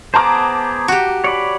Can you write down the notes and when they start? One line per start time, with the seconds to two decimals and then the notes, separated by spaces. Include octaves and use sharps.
0.14 B3 G#4 C5 A5 A#5 D6
0.88 F#4 G4
1.24 C#5 D5 B5